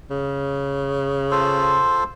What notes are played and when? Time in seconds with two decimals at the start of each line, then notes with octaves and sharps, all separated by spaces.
0.10 C#3
1.31 F4 A4 C5